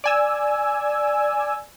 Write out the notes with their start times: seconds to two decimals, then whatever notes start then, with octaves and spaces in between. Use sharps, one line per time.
0.04 D5 G#5 E6